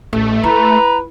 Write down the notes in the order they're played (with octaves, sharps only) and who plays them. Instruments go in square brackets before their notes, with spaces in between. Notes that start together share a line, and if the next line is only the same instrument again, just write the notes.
[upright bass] A1 [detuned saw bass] A3
[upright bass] E4 [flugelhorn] B4 [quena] A#5